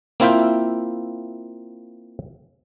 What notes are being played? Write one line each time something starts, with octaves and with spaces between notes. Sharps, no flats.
A#3 C4 E4 F4 E5 G5